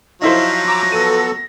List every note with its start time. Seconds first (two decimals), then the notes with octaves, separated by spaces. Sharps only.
0.22 F3 F#3 D#4 E4 C5 F5 A#6
0.67 A#5 D6 E6
0.92 B3 A4 D#7